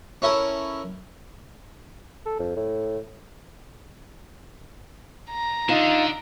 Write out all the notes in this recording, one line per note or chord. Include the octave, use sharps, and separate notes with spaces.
C#4 E4 A4 A#4
A4
F2
A2
A#5
D3 D#4 F4